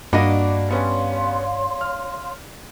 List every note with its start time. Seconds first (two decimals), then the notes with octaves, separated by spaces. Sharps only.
0.13 G2 A#3 D4 F#4 D#5 B5
0.69 G3 B3 C#4 C#5 F5 C6
1.81 F6